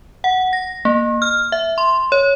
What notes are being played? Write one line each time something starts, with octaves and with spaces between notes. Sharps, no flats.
F#5
A#6
A#3
F6
E5
C6
C#5